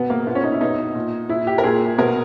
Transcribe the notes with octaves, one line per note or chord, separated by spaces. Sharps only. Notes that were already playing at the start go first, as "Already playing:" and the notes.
Already playing: B2 B3
A#3
A#2 B3
C#4
D#4
E4
B2 D#4
A#2
A#2 E4
G4
A#4
A#2 G#4
B2 A#4